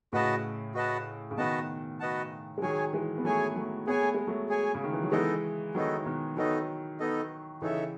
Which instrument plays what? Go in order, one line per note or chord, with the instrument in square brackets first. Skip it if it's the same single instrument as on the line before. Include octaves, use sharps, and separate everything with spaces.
[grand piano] A2 C#3 [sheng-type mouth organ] F#4 B4 D#5 F#5 A5
[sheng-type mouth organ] F#4 B4 D#5 F#5 A5
[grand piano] C#3
[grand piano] B2 D#3 [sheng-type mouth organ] F#4 B4 D#5 F#5 A5
[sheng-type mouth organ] F#4 B4 D#5 F#5 A5
[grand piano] G#3
[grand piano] D#3 F#3 [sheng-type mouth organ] G#4 C#5 G#5
[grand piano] E3 G#3
B3
[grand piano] F#3 A3 [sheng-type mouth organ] G#4 C#5 G#5
[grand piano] F#3 A3
[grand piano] B3 [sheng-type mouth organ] G#4 C#5 G#5
[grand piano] A3
G#3
F#3 A3
[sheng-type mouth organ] G#4 C#5 G#5
[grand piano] C#3
D#3
E3
F#3
[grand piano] E3 G#3 [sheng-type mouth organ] B3 D#4 A4 D#5
[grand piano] D#3 F#3 [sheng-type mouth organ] B3 D#4 A4 D#5
[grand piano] B2 D#3
[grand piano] D#3 F#3 [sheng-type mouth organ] B3 D#4 A4 D#5
[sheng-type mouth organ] B3 D#4 A4 D#5
[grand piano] C#3 E3 [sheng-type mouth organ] D#4 A4 C#5 E5